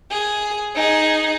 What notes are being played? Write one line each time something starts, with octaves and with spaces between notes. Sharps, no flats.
G#4
D#4 G#4